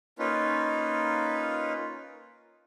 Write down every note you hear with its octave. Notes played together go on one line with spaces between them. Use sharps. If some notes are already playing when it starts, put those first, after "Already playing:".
A#3 C#4 D#4 F4 B4